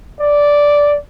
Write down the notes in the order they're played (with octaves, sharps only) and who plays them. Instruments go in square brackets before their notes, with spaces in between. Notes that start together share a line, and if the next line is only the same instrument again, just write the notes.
[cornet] D5